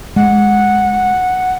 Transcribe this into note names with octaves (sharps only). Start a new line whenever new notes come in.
G#3 F#5